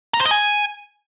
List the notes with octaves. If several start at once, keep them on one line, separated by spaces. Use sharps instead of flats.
A#5
C5
D#5
G#5